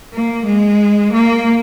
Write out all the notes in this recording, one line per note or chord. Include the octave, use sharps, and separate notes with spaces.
A#3
G#3
A#3